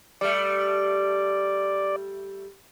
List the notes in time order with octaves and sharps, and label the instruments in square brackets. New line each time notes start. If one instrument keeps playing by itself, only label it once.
[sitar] G3 A3 [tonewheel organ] D5